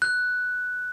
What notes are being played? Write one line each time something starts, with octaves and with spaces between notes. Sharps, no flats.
F#6